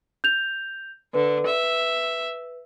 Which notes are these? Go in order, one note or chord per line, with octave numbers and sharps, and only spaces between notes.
G6 F7
D3 B4
E5